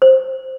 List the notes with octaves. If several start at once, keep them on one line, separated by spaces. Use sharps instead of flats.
C5